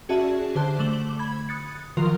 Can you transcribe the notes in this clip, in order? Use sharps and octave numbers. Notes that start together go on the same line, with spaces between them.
C#4 F#4 G#4 D5 E5 A5
D3 G4 C5 A5 F#6
D3 A3 D6 E7 F#7 G7
B5 G#6
D#6 F#6 A6 C#7
D#3 F3 F#3 F4 A#4 C6